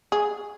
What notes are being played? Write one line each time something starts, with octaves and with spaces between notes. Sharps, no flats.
G#4